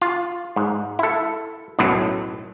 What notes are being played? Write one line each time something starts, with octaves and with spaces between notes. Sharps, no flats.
F4
G#2
E4 A4
B1 F#2 A2 F#3